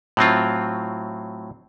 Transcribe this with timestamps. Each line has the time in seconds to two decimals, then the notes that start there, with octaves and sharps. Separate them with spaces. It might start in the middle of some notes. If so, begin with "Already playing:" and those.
0.17 A2 F#3 C4 F4